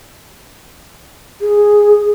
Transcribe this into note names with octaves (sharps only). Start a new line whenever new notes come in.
G#4